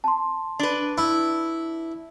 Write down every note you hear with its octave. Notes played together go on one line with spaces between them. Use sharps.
A5 C6
D4 B4
E4